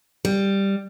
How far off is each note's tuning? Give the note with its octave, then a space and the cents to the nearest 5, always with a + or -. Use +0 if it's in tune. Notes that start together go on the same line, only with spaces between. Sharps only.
G3 +5